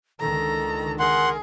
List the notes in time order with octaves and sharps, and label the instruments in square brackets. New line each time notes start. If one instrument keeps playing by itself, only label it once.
[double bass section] C#2 D3 D#3 [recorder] A4 [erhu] A#5
[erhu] G#4 [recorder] A#4 [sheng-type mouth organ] F#5 C6